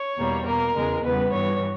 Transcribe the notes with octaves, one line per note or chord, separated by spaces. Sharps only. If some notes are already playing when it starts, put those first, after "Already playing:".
Already playing: C#5
E2 B2 G3 A#3
B2 A#3 A#4
E2 C#3 G#3
E2 C#3 G3 B3 B4
G2 E3 G3 C#5